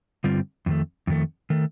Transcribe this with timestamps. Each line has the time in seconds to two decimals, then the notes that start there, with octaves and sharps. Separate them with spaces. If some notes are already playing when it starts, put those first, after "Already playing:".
0.24 G2 D3 G3 C4 F4
0.66 F2 D#3 A3
1.07 F2 D#3 A3
1.50 D#3 A3